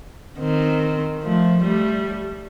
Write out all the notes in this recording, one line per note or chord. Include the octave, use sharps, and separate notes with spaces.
D#3 C4
F3 A3
G3 A3